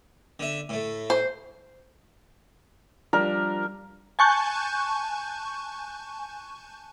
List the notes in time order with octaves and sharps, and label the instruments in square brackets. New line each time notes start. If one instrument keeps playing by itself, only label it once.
[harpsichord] D3 E5
A2 A3
[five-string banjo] C5
[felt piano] F3 G3 D4 [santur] A#4
[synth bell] G#5 A5 C#6 F#6 G6